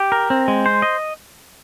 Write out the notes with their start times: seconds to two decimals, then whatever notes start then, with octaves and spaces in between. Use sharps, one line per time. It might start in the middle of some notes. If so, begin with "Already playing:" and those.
Already playing: G4
0.12 A#4
0.30 C4
0.48 G#3
0.66 C5
0.82 D#5